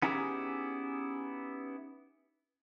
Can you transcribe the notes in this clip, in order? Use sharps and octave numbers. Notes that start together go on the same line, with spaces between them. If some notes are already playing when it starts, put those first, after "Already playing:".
B3 C#4 D#4 E4 G4 G#4